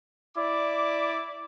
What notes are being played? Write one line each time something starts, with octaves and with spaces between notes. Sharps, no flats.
E4 D5 D6